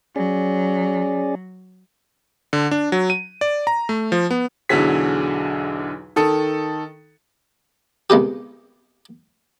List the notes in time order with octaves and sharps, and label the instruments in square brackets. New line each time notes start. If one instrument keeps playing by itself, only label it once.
[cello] F#3 [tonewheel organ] C#4 G#4 D5
[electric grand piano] D3
D4
F#3
D#7
D5
A#5
A3
F3
B3
[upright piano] B1 E2 D3 F#3 G#4 B6
D#3 A4 D#6 C#7
[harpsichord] C2 G#3 B3 G4